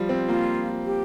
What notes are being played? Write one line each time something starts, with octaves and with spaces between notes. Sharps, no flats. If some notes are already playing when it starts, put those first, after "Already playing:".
Already playing: F3 G3
C4
A#3 F4
G4